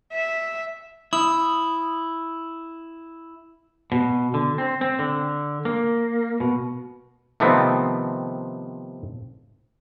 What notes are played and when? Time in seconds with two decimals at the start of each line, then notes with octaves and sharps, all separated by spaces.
0.13 E5
1.13 E4 D#6
3.92 B2
4.34 D3
4.58 C4
4.81 C4
4.99 D3
5.65 A#3
6.40 B2
7.40 C3 D#3 F3 A3 B3 C4